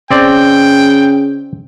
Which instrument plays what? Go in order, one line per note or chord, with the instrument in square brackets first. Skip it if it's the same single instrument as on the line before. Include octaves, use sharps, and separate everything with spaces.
[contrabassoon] C#3 [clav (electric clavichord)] C4 D5 [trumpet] G5